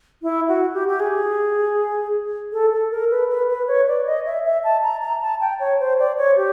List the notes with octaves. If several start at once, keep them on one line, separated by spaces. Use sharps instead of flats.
E4
F#4
G4
G4
G#4
A4
A4
A#4
B4
B4
B4
C#5
D5
D#5
E5
E5
A5
A#5
A#5
A5
G5
C#5
C5
D5
C#5
G4